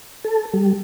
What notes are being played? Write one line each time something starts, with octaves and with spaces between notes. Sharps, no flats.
A4
G3